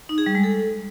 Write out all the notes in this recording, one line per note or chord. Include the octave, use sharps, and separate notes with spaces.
D#4
G#4
G3
G#3
A4